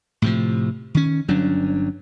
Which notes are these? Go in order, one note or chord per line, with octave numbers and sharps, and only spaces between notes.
A2 C3 F3
D#3 C#4
G1 F#3 C#4 D4